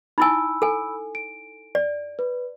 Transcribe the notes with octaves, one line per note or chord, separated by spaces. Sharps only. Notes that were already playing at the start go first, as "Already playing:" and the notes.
D#4 E4 G#5 B5 E6
A4 G#5
D7
D5
B4